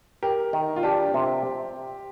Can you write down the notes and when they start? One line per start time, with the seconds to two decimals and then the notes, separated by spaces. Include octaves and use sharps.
0.23 G4 A#4
0.53 D#3
0.76 F4
0.83 D4 G4
1.14 C3